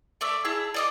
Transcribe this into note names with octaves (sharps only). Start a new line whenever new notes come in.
A3 D5 E5
E4 G#4 A5 E6
D5 D#5 D6